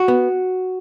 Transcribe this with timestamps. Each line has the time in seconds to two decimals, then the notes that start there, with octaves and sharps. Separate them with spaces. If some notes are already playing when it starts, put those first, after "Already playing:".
Already playing: F#4
0.08 B3